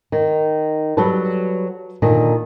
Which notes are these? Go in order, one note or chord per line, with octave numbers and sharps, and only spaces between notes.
D#3
F#3 G3 A4 B4
A#2 D3 D#3